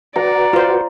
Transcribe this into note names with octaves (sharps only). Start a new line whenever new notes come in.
F#4 B4 D5 F#5 A#5
F4 C5